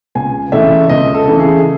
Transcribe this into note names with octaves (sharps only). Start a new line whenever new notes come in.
C#2 G#5
C#3 E3 A3 E5
C#2 D#5
A4
C#3 E3 A3
G#4